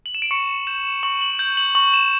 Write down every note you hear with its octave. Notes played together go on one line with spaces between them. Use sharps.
F#7
E7
D7
C#6 C#7
G6 E7
C#6 F#7
F#7
G6 F#7
F#7
C#6 F#7
E7